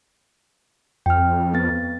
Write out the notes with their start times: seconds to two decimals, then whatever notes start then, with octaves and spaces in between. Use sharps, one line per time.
1.06 F2 G5 F6
1.54 B3 A6